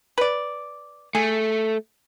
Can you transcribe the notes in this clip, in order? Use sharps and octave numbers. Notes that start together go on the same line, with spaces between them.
B4 D5
A3 G#4